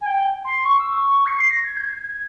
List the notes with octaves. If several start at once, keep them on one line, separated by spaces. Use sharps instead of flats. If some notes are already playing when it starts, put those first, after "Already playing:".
G#5
G5
C6
C#6
E6
C#6
C#7
C7
A#6
G#6
G6
G#6
G#6